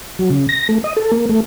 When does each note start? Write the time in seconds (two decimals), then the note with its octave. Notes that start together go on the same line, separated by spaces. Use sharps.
0.19 F#3
0.30 C#3
0.49 A#6
0.69 A3
0.84 D#5
0.97 A4
1.12 A#3
1.29 A3